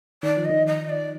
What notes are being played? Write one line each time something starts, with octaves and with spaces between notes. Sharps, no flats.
D#3 D5
F3
D#3 D#5
D#5
D5